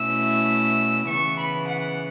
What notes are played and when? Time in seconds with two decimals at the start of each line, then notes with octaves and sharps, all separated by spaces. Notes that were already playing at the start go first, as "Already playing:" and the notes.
Already playing: B2 A3 C#4 E4 E6
1.08 C#3 E3 B3 C#6
1.39 B5
1.68 F#5